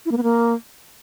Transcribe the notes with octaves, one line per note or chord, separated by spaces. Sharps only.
E4
A#3
B3
A#3